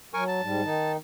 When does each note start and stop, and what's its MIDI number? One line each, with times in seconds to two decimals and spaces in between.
0.14 0.41 54
0.14 0.24 70
0.14 0.24 80
0.14 0.24 85
0.28 0.92 81
0.41 0.62 44
0.41 0.62 55
0.63 0.97 51
0.63 0.97 63